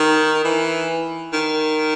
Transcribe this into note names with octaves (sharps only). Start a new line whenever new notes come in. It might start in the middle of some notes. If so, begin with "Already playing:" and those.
Already playing: D#3
E3
D#3